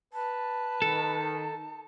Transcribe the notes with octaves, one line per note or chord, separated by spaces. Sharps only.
B4 A5
D#3 A4